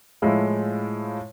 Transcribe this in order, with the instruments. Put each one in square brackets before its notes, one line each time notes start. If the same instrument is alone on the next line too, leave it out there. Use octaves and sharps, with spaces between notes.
[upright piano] A2 F3 G#3 E4 F4